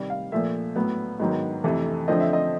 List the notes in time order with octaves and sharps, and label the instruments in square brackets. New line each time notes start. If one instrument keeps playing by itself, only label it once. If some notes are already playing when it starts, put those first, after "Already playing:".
Already playing: [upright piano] C3 D#3 G3
F5
A#2 F3 A3 E5
A2 F#3 B3
G#2 D#3 F#3 B3
F2 C3 E3 A3
D3 F3 A3 C4 D#5
E5
D#5